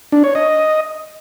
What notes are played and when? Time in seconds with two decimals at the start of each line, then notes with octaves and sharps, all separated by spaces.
0.12 D4
0.24 C#5
0.35 D#5